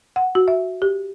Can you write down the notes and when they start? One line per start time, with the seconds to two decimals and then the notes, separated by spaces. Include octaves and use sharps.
0.16 F#5
0.35 F#4
0.48 E5
0.82 G4